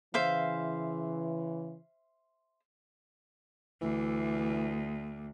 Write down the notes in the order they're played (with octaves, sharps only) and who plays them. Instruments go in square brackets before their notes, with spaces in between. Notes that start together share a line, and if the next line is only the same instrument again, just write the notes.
[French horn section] C#3 E3 [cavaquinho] C5 E5 F5
[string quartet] D2 [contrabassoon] E3